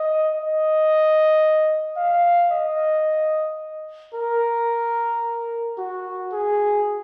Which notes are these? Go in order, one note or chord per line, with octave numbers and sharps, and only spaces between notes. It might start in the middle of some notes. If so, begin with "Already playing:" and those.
Already playing: D#5
D#5
F5
D#5
A#4
F#4
G#4